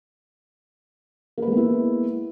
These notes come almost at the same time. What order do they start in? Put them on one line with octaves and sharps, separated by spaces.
A#3 B4 G#3 B3 E4